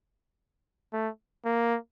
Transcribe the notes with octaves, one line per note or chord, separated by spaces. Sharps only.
A3
A#3